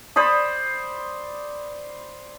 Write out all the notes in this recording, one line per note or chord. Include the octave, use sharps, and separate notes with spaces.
C5 D5 B5 D#6